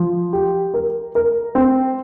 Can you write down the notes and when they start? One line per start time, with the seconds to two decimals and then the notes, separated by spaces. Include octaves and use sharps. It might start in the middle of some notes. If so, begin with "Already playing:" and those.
Already playing: F3
0.33 G4
0.74 A#4
1.15 A#4
1.55 C4